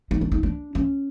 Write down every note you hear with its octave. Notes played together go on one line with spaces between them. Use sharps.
D#4
D4
D#4
D4
C#4